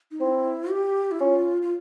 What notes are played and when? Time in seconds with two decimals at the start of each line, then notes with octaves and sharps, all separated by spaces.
0.11 D#4
0.21 C4 E4
0.71 G4
1.11 E4
1.20 C#4 F4
1.62 F4